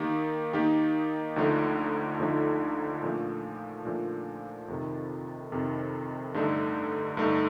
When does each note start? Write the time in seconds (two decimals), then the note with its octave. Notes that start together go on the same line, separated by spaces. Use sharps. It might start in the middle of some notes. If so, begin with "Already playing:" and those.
Already playing: D#3 A#3 D#4 G4
0.53 D#3 A#3 D#4 G4
1.36 D2 D3 F3 A3 D#4
2.19 D2 D3 F3 A3 D#4
3.03 A#2 F3 A3 D4
3.85 A#2 F3 A3 D4
4.68 F2 C3 D#3
5.52 F2 C3 D#3
6.34 G2 D3 A3 D#4 A4
7.17 G2 D3 A3 D#4 A4